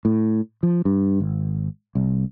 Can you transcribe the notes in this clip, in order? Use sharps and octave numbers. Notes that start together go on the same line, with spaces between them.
A2
F3
G2
G#1
C2